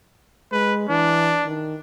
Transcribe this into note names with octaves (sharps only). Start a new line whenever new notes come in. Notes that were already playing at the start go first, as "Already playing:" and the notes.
G#3 B4
E3 D4
D#3